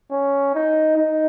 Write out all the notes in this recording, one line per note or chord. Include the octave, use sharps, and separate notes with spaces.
C#4
D#4
D#4